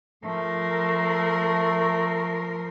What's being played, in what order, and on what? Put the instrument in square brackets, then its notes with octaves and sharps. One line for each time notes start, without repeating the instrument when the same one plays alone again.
[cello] F3 A#4 [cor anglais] A3